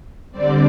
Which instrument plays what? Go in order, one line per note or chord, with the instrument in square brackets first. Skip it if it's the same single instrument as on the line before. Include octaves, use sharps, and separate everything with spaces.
[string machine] D3 G3 C4 D5